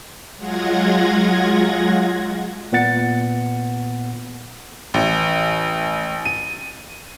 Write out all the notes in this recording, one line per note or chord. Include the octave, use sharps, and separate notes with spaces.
F#3 G#3 F4 F#5 G#6 A#6
A#2 B3 F#5 A6 C#7
A1
D#7